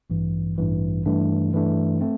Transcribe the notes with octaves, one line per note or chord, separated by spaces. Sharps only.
A1 G2 E3
A1 G2 E3
G2 E3 A3 D4
G2 E3 A3 D4
A3 C4